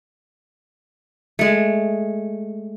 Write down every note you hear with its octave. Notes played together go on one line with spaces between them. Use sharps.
G#3 A3